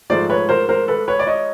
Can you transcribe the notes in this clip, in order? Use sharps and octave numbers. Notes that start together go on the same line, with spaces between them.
G#2 F3 A3 C5 D5
B4 C#5
A#4 C5
A#4 C5
A4 B4
B4 C#5
D5
C#5 D#5